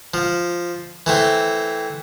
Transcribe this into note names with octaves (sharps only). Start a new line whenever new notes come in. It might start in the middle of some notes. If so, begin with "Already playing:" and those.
F3
E3 A3 C4